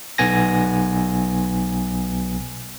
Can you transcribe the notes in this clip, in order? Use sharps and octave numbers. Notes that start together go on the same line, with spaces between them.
B1 B3 G#5 A#6